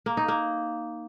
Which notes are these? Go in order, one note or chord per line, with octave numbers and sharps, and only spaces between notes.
A#3
D#4
A#3